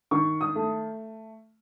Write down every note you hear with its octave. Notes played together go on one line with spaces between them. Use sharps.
D#3 C#6
D#6
A3